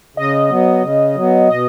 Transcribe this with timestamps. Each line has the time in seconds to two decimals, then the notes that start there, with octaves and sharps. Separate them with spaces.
0.17 C#3 D#5
0.50 F#3 B3
0.83 C#3
1.15 F#3 B3
1.48 B2 D#5